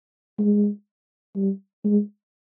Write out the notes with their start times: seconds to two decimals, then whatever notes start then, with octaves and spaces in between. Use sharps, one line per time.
0.38 G#3
1.36 G3
1.84 G#3